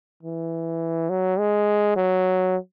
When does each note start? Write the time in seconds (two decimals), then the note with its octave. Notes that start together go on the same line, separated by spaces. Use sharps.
0.23 E3
1.09 F#3
1.38 G#3
1.96 F#3